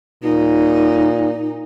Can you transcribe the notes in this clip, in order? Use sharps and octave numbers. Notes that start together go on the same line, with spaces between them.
A#2 D#4